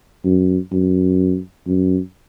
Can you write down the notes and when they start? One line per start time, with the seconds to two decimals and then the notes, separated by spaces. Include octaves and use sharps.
0.25 F#2
0.72 F#2
1.66 F#2